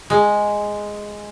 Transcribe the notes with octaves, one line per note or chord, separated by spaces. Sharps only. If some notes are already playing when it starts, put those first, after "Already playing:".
G#3